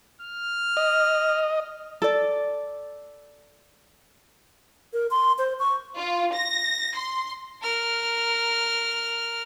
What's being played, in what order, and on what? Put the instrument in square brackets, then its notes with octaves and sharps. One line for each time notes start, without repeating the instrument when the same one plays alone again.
[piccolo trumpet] F6
[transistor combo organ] D#5
[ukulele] A4 D5
[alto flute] A#4
C6
C5
C#6
[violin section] F4
A#6
C6
[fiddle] A#4 F6